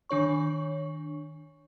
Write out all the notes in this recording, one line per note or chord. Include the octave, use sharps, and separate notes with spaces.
D#3 D4 C#5 C#6